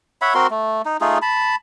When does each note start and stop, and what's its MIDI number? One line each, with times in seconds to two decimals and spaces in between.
0.22 0.34 73
0.22 0.34 76
0.22 0.34 78
0.22 0.34 83
0.34 0.47 60
0.34 0.47 66
0.34 0.47 70
0.34 0.47 84
0.50 0.82 57
0.85 0.97 63
1.01 1.18 57
1.01 1.18 63
1.01 1.18 65
1.01 1.18 68
1.22 1.56 81
1.22 1.56 83